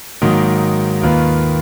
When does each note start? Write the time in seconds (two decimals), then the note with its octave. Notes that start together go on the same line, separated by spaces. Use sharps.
0.22 G#2 D#3 F#3 A#3 D#4
1.02 D#2 D#3 A#3 F4 B4